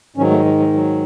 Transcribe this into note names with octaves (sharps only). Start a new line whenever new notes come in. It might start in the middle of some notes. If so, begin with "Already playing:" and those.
G#2 D#3 F#3 C#4
A3
F#3
F#3
F#3